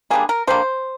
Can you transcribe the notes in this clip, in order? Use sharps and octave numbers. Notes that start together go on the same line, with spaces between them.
D3 G3 A#3 G#4
A#4
D3 G3 A#3 C5